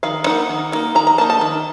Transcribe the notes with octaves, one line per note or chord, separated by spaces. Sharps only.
D#3 F5
A#3 D#4 F#5
D#3
A#3 D#4
D#3 A#5
A#5
A#3 D#4 A5
A5
D#3